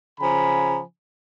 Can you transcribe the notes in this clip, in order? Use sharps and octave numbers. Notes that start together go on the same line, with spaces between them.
C#3 F3 G#5 A#5 B5